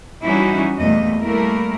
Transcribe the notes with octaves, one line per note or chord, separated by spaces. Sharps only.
E3 G3 C#4 D#4 E4 F#4
E2 A#2 G3 A3 D#5
G3 A3 A#3 E4 A#4